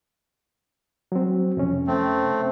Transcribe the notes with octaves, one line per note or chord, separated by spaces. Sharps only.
F#3 C4
F2 C3 C#4
A3 C4